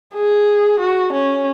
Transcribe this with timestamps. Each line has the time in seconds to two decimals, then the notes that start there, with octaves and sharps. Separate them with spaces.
0.14 G#4
0.80 F#4
1.13 C#4